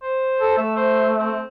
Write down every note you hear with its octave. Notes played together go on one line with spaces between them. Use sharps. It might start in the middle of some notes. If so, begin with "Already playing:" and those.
C5
A4
A3 E5
C5
C4